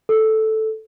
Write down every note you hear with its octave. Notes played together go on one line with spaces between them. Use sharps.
A4